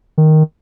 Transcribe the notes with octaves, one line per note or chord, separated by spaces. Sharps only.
D#3